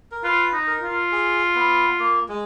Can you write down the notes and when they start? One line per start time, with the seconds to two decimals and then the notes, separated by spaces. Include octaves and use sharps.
0.12 A#4
0.23 F4 B4
0.53 D#4
0.67 A#4
0.81 F4
1.12 G#4
1.55 B3
1.99 A#3
2.29 G#3